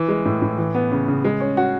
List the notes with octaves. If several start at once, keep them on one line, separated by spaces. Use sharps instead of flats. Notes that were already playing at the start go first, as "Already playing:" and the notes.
Already playing: E3
G#3
A2
A2
E3
B3
C#3
C#3
G#3
C#4
F#4